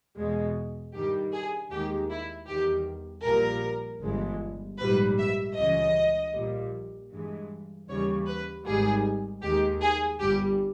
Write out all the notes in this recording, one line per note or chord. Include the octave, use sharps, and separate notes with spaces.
E2 B2 G#3
G2 D#3 G3 G4
G#4
D#2 D#3 G#3 G4
E4
E2 D#3 G3 G4
A#1 A#2 G3 A#4
G1 G2 E3 G#3
A#1 G#2 G3 B4
E5
C#2 C#3 E3 D#5
A#1 A#2 G3
G2 E3 G#3
D#2 C#3 E3 G3 C#5
B4
G#1 G#2 D#3 G3 G#4
D#2 D#3 G#3 G4
G#4
G1 G2 G3 G4